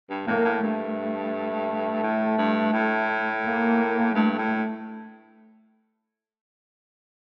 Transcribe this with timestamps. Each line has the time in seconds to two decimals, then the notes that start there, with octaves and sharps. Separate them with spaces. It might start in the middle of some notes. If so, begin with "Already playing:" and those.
0.10 G2
0.27 A2 A#3
0.45 A2
0.63 G2 A3
2.03 A2
2.38 G2
2.73 A2
3.45 A#3
4.15 G2 A3
4.38 A2